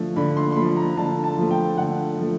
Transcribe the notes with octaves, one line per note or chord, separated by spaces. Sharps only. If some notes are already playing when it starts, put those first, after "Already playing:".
Already playing: D3 F3 A3
D3 B5
C6
C6
F3 A3 B5
A#5
D3 A5
A5
F3 A3
G5
D3 F#5
F3 A3